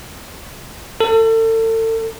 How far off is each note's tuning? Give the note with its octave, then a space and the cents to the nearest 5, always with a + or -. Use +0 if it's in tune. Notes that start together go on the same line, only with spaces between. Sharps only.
A4 +35